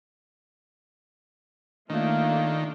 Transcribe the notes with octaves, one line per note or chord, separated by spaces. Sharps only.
D#3 A3 A#3 D4 F4